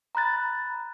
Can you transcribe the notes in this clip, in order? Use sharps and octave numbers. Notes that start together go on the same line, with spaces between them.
A#5 B5 F#6 A6